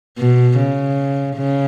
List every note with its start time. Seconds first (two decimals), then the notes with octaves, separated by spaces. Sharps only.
0.18 B2
0.59 C#3
1.37 C#3